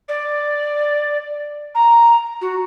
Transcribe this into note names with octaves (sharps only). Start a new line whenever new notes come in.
D5
A#5
F#4